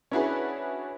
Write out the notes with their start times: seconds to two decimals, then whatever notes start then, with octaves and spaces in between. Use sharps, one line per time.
0.11 C#4 D4 E4 F#4 G#4 B4